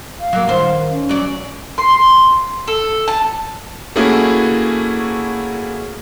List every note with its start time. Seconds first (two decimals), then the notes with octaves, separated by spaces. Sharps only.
0.20 F5
0.33 F#3 A#3
0.48 D#3 C5
0.90 C#4
1.09 F#3 D5
1.78 C6
2.67 A4
3.08 A5
3.96 A3 A#3 C#4 E4 F#4 G#4